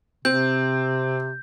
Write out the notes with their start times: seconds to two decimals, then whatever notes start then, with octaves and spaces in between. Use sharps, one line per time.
0.25 C3 C4 G6